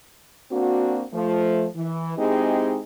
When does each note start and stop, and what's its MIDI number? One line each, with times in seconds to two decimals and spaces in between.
0.51 1.03 58
0.51 1.03 60
0.51 1.03 62
0.51 1.03 66
1.13 1.66 53
1.13 1.66 57
1.76 2.15 52
2.17 2.80 56
2.17 2.80 60
2.17 2.80 63
2.17 2.80 64
2.17 2.80 67
2.17 2.80 68